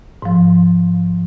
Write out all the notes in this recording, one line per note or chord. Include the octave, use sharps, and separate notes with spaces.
G#2 F3